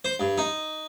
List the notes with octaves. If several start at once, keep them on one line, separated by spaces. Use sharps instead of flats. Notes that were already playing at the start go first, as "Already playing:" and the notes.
C5
G2
D#4